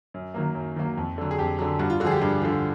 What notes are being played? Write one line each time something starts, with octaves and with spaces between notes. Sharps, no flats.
F#2
D#3 F#3 A#3
F#2
D#3 F#3 A#3
F2
D3 F#3
G#4
F2 G4
D3 F#3
G2 F#4
F4
D3 F3 F#4 G#4
G4
G2
D3 F3